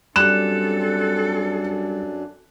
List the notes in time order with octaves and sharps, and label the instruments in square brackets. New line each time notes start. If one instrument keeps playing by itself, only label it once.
[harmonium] F#2 D4 [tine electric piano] G3 G4 [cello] C4 A4 [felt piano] F#6 E7